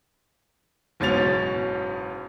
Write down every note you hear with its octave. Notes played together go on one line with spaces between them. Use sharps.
F#1 G#2 B2 C#4 A6 F7